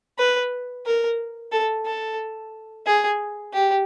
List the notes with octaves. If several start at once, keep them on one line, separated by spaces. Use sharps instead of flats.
B4
A#4
A4
A4
G#4
G4